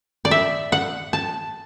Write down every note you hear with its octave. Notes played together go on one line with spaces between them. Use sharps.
D5
E5
F#5
A5